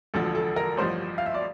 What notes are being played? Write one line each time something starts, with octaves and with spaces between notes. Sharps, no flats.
E1 D2 D3 F3 A4
A4
A#4
A1 G2 F3 C5
F5
E5
D5